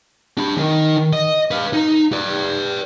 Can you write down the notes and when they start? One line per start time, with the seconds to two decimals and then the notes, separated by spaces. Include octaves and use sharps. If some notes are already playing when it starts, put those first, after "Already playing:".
0.38 D4 B5
0.57 E2 D#3
1.13 D#5
1.51 B4 F5
1.73 D#4 A#5
2.12 B4 D5